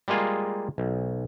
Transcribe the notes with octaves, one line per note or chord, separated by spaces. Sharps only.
G3 G#3 A#3 F4 G#4
B1